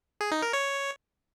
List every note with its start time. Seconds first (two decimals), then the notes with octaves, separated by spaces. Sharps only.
0.21 G#4
0.32 D#4
0.42 A#4
0.53 C#5